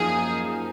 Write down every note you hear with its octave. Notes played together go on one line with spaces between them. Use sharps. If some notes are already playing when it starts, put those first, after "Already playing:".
Already playing: F#2 F3 A#3 D#4 G#4